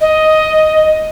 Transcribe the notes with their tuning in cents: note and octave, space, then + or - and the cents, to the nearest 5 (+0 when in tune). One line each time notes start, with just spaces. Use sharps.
D#5 +5